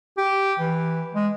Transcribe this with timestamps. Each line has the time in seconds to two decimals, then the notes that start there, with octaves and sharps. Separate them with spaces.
0.18 G4
0.59 E3
1.15 G#3